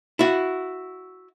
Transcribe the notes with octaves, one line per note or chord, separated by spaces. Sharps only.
E4 F#4